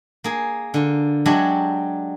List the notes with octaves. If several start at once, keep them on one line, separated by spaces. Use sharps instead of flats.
A#3 G#4
D3 F4
F#3 G#3 D4 G4 C#5 E5